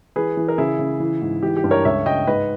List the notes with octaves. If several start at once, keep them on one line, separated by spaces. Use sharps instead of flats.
E3 G#4 B4
E3
A#4
C#3 E4 G#4
C#3
E3
G#2
E3 G4
G4
G2
A#4 C#5
C#2 C#5 E5
C#2 D#5 G5
G#2 B4 D#5